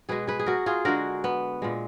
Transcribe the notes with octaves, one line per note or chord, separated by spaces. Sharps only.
B2 G#3 G#4 B4
G#4 B4
G#4
F#4 A#4
F4 G#4
D3 G#3 F#4 A#4
B3
A#2 G#3